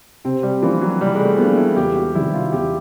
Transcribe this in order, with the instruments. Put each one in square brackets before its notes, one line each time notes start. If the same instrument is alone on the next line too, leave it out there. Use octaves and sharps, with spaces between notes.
[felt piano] C3 [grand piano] C4
[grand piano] G3
[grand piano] E3 [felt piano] F3 A#3 D4
[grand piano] F#3
[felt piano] C3 [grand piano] G3
[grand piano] G#3
A3
[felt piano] F3 A#3 D4 [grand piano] B3
[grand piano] E4
[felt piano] E2 [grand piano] G4
[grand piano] F#4
[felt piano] C3 D#3 G3 [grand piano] E4
[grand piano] F4
[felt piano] E2 [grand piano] G4